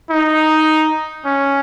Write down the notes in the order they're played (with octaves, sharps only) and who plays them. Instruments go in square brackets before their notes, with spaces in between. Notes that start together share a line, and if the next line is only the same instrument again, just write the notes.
[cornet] D#4
C#4